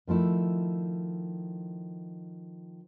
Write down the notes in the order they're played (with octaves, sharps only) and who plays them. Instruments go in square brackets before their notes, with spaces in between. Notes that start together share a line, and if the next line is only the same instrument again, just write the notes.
[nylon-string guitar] D#3 F3 A3 E4